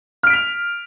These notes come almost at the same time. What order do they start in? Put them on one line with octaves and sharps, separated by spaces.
F6 D7 B6 F7